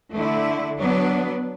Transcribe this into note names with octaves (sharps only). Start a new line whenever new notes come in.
D3 A3 E4
F#3 B3 D4